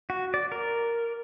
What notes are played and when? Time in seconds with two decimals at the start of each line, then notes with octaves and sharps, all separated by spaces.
0.10 F#4
0.34 D5
0.52 A#4